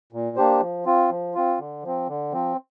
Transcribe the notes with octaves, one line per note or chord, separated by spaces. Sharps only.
A#2
A#3 D4 G4 C5
F3
C4 F4
F3
C4 F4
D3
F3 C4
D3
F3 C4